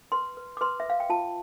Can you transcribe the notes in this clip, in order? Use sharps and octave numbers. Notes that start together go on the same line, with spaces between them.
B4 C6
B4
D6
B4 C6
E5
B4 F5
G5
F4 A5